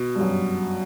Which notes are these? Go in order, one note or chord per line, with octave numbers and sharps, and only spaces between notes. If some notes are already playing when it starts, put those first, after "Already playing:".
Already playing: B2
G2
F#2